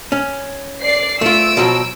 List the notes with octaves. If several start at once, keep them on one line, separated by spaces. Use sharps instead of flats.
C#4
D5 C7
A3 F4 E6 D7
B2 F3 F#3